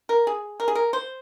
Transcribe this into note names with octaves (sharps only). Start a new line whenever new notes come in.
A#4
G#4
A#4
G#4
A#4
C5